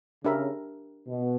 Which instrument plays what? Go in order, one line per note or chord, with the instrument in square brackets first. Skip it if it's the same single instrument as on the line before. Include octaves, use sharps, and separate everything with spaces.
[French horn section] C#3 [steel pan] D4 G4 A#4 E5 B5
[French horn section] B2